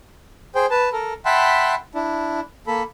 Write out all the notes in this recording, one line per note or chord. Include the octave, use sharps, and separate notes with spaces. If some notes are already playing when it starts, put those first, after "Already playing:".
G#4 C5 G5
B4 A5
A4 A#4
E5 F#5 G5 A5 B5 C6
D4 E4
A#3 A4 B5